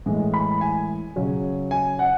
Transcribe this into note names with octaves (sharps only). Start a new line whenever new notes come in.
A2 E3 G#3
B5
G#5
C#3 F#3 C#4
G#5
F#5